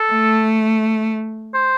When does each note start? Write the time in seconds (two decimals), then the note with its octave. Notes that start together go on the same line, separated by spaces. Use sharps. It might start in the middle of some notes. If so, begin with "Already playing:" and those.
Already playing: A4
0.12 A3
1.54 C5